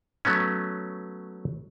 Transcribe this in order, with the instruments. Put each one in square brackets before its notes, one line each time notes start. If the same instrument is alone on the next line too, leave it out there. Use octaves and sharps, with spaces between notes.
[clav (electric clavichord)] F#3 A3 B3 C#4